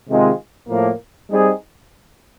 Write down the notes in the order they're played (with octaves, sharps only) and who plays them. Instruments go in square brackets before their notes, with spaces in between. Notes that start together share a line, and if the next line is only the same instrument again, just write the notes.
[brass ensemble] C3 D#3 G#3 C4 F4
A2 F3 A#3
G3 C4 D#4 G#4